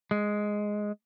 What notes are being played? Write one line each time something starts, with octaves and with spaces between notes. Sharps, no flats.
G#3